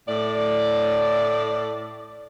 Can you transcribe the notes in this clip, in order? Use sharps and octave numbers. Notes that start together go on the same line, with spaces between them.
A2 D5